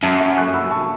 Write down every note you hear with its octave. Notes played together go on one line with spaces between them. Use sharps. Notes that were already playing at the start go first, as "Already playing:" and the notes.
F#2 E5 A5
E5
C#6 F#6
B5 E6
A5 C#6